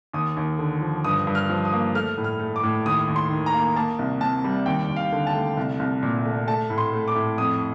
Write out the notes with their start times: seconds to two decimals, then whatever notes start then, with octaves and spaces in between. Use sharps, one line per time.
0.13 D#2 D#6
0.37 D#2
0.59 D3
0.81 F3
1.04 G2 D#6
1.27 G2
1.35 F6
1.49 F3
1.65 D#6
1.72 A#3
1.95 A3 F6
2.17 A2
2.24 F6
2.39 A3
2.56 D6
2.63 A2
2.86 D#2 D#6
3.08 D#2
3.16 C6
3.30 D#3
3.46 A#5
3.54 A#3
3.76 A#3 A5
3.99 C2
4.21 C3 A5
4.44 G3
4.66 D#2 G5
4.89 D#2
4.96 F5
5.12 D3
5.27 A5
5.34 A3
5.57 C2
5.79 C2
6.03 A#2
6.25 A3
6.47 A3 A5
6.70 A2
6.78 C6
6.93 A3
7.08 D6
7.15 A2
7.37 F2 D#6